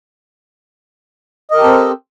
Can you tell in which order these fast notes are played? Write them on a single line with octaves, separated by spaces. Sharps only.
D#5 A#4 G4 A4 C4